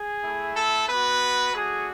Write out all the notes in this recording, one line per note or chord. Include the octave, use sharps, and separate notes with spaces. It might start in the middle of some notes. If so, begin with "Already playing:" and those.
Already playing: G#4
A3 E4
A4
B3 F#4 B4
A3 D4 F#4 G#4